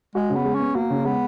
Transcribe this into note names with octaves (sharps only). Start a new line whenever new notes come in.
G#3 F#4
C#3
B3
G#3
B3 C#4
A#3 F#4
C#3
G#3 B3